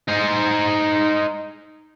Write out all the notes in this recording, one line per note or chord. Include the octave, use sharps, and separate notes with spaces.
D#4 C5